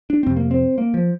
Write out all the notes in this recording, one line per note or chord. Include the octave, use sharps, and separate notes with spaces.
D4
F2 C3 C4
A#3
C4
A#3
F3